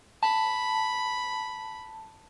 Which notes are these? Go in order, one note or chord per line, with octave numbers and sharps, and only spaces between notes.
A5 B5